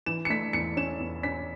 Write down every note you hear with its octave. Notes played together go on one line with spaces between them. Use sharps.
E3 E7
C#7
A3 B6
E2 C#7
C#4 E7
E2
C#4 B6